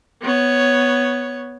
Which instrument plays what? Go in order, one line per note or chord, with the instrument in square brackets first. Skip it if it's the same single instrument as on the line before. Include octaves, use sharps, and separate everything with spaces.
[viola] B3 C#5